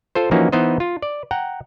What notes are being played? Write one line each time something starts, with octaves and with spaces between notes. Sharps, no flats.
F4 A4 C5
E3 F3 A#3 C#4 D#4 F#4
E3 B3 D#4 C5 D#5
F4
D5
F#5 G5 A#5